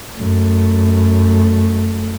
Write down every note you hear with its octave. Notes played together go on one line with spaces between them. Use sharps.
F#2 A3